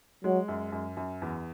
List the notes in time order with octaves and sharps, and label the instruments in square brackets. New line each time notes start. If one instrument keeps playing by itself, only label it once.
[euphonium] F#3 [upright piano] G#3
[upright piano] F#2
F#2
F#2
E2